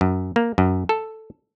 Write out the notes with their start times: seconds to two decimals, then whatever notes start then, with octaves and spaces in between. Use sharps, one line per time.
0.01 F#2
0.36 A#3
0.58 F#2
0.89 A4